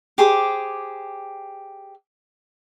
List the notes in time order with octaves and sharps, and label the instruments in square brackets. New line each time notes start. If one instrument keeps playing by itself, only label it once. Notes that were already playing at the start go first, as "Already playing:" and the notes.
[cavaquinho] G4 G#4 C5 D6